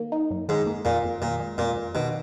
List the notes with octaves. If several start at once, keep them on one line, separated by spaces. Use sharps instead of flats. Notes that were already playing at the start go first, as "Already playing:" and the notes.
Already playing: D#3 A#3
D#4
F#2
G#2 D#3
A#3
F2 A#2
F2
A#2 D#3
G#3
F2 A#2
F2
B2 D#3